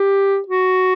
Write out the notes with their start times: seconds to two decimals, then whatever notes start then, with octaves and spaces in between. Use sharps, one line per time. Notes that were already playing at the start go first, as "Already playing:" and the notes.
Already playing: G4
0.48 F#4